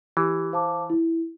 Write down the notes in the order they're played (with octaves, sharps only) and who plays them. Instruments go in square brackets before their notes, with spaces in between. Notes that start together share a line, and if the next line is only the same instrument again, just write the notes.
[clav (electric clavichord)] E3 [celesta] G4
[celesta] C5 F5 A5 D6
E4